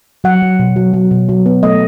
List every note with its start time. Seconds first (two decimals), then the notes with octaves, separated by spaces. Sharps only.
0.24 F#3 F#5
0.42 F#3
0.59 B2
0.76 F#3
0.93 F#3
1.11 B2
1.29 F#3
1.46 B3
1.63 A3 D#5